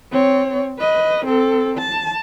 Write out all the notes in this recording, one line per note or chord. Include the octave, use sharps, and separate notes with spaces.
C4 C#5
B4 D#5
C4 A4
A5